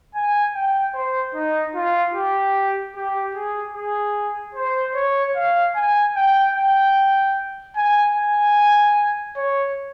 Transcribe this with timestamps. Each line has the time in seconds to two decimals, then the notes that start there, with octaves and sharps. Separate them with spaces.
0.15 G#5
0.55 G5
0.94 C5
1.35 D#4
1.75 F4
2.15 G4
2.96 G4
3.35 G#4
3.75 G#4
4.55 C5
4.95 C#5
5.36 F5
5.75 G#5
6.16 G5
6.55 G5
7.76 G#5
8.16 G#5
9.36 C#5